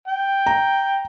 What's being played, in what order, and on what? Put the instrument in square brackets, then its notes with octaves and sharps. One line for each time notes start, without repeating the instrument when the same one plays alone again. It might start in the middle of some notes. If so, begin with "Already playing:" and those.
[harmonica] G5
[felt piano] A#5